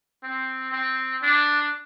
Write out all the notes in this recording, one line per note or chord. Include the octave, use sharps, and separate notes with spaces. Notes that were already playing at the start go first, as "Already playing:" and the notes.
C4
C4
D4